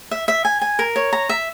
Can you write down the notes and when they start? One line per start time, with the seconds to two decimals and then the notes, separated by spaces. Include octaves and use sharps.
0.11 E5
0.28 E5
0.45 G#5
0.61 G#5
0.79 A#4
0.96 C#5
1.13 A#5
1.29 E5